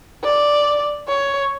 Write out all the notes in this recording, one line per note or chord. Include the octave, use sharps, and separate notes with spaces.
D5
C#5